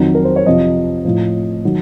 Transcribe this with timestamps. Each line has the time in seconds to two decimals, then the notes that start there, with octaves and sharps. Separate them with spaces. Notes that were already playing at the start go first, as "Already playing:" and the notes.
Already playing: F2 D#3 F#3
0.15 A#4
0.24 C5
0.36 C#5
0.46 F2 C3 F3 D#5
1.05 A2 F3
1.65 D#3 F#3